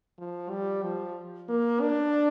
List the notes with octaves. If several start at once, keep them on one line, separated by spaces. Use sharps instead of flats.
F3
G3
F3
A#3
D4